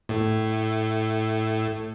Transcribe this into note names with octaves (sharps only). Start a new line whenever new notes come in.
A2 A3